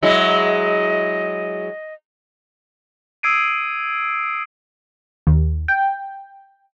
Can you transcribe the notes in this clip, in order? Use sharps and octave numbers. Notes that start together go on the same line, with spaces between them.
F#3 G#3 E4 D#5
D#6 E6 G#6 C7 D7 D#7
D#2
G5